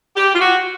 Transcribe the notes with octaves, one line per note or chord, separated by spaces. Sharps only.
G4
F4
F#4